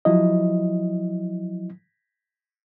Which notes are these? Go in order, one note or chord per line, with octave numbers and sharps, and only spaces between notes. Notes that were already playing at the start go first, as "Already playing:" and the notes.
F3 F#3 E4 D#5